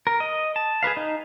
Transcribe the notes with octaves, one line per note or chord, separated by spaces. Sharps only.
A#4
D#5
A5
G#4 A#4 B4 F5
D#4